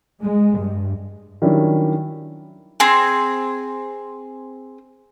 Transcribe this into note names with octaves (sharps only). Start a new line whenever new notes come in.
G#3
G2
D#3 F#3 G3 C#4 D4 E4
C4 G#4